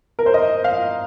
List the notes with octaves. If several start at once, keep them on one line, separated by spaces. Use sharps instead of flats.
A#4
C5
D#5
F5